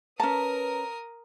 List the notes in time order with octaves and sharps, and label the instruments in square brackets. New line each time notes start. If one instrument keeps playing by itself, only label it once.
[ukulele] C#4 A5 [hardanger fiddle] A#4 D#6 [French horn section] B4 [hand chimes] A#5